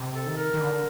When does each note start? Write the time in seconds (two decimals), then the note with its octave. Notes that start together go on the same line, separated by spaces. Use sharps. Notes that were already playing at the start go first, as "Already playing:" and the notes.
Already playing: C3
0.15 A4
0.26 D#3
0.37 A#4
0.54 D#3
0.60 D3